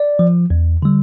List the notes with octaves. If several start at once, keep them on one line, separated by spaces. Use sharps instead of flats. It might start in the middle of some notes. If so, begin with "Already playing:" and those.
Already playing: D5
F3
E2
D3 G3